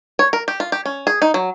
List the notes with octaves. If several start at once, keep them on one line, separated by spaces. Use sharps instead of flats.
C#5
A#4
G4
F4
G4
C#4
G#4
D#4
F#3